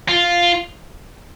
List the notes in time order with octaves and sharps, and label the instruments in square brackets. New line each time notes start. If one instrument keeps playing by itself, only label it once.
[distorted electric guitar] F4